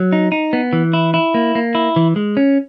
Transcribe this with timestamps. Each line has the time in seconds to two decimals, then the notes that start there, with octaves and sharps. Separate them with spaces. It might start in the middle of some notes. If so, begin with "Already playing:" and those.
Already playing: F#3
0.12 D#4
0.32 D#4
0.53 B3
0.73 E3
0.93 E4
1.14 E4
1.34 A#3
1.55 A#3
1.75 E4
1.96 E3
2.16 G#3
2.37 C#4